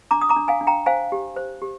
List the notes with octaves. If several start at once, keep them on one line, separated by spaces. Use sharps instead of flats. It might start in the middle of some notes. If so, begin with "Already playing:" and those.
D4 A#5 D6
D#6
A#5 D6
D4
F5 G#5
D4
G5 A#5
C5 F5 G#5
G4
C5
G4